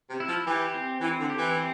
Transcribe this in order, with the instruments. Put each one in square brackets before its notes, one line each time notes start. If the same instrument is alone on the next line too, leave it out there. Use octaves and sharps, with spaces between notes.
[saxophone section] C3
[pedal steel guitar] E4
[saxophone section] F3
[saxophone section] E3 [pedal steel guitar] G4
[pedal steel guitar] C4
[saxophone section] E3 [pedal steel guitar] C4
[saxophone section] D3
[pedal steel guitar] G4
[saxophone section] E3
[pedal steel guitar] C4